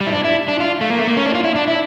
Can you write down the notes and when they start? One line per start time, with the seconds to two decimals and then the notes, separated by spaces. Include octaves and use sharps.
0.01 G3
0.07 E4
0.13 D4
0.24 E4
0.48 D4
0.60 F4
0.81 A3
0.90 A#3
0.99 A3
1.08 A#3
1.17 C#4
1.26 D4
1.35 F4
1.44 E4
1.56 D4
1.68 E4